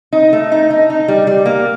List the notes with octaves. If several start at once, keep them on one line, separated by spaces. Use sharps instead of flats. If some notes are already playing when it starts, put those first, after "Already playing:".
D#4
A3
D#4
D#4
D#4
G3
G3
A#3